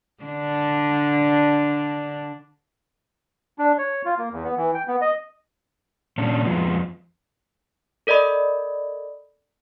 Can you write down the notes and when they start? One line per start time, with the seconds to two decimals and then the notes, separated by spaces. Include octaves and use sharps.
0.24 D3 D4
3.59 D4
3.78 C#5
4.05 F4
4.18 A#3
4.32 E2
4.44 B3
4.57 E3
4.74 G5
4.88 B3
5.01 D#5
6.18 A#2 C#4 D4
6.45 F2 F3 G#3 B3
8.07 A4 A#4 D5 D#5 B5